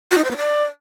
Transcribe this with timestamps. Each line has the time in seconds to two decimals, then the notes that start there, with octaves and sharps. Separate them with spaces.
0.11 F#4
0.18 D#4
0.24 C5
0.31 B3
0.37 D5